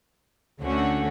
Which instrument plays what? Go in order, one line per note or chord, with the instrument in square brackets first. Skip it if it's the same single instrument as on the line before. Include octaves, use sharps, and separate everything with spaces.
[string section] D2 D3 A3 C#4 F#4